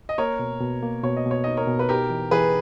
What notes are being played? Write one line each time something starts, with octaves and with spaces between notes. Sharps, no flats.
D#5
A#3 A#4 C#5
B2
B2
A#3
B2 C#5
D#5
B2
C#5
D#4 D#5
A#4 C#5
B2
B4
D#4 G4 A#4
E3
E3 G#4 B4